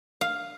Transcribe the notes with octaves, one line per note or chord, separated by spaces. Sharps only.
F5